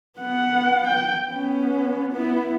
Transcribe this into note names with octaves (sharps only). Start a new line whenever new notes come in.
B3 F#5
G5
B3 C#4
B3 E4